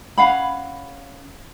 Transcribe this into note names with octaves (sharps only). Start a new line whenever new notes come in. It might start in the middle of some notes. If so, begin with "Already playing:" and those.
C#4 F5 F#5 B5